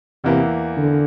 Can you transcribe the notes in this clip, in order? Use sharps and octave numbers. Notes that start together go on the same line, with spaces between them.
E2 C3 E3 A#3 E4
D3